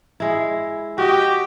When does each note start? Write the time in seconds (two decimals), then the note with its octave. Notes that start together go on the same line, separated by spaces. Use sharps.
0.20 G#3 E4
0.98 F#4 G4 D#5